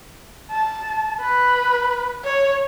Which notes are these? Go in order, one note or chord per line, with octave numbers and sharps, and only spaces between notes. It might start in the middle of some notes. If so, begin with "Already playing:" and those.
A5
B4
C#5